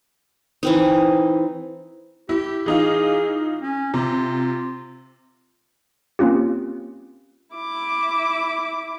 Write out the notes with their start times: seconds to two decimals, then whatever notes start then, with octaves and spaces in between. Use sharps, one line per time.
0.63 E3 C4 D#4
2.29 E4 G4
2.66 E3 D#4 F4 G#4
3.62 C#4
3.94 C3 F4
6.19 A#3 C4 C#4 F4 G4
7.55 E4 D6